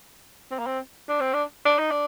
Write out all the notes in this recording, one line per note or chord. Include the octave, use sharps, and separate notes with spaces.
C4
A#3
C4
D4
C4
D4
D4
D#4
D4